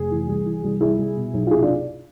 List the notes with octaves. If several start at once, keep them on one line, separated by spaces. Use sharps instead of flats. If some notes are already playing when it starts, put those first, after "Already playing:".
Already playing: F1 G#4
E3
C2
E3
C2
C2 E4 G#4
C2
B2
B1
F4
C3 E4 G#4
D4 F4